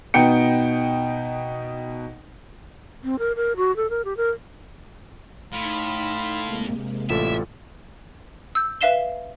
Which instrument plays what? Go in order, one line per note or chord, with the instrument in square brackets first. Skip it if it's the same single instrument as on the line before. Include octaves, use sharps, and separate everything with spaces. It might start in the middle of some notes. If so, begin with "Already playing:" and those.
[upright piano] B2 B3 D#4 G5 C#7
[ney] C4
A#4
A#4
F#4
A4
A#4
G4
A#4
[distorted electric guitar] A2 [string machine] D#4 D#5 [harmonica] F5 B5 C6
[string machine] C3 G#3 A#3
[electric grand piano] A1 F4 A4 [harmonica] D4 E4 [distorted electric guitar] E5
[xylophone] E6 G6
B4 E5 F5 C7 E7 G7